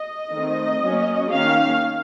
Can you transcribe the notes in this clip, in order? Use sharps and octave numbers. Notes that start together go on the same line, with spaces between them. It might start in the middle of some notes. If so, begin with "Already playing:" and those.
Already playing: D#5
D#3 A3 C4
F#3 A#3 C#4
D#3 A#3 C#4 F5